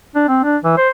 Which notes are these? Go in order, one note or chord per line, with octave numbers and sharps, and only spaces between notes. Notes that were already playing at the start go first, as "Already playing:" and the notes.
D4
C4
D4
E3
C5